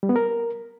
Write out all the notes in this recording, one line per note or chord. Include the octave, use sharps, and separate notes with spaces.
G3
B3
A#4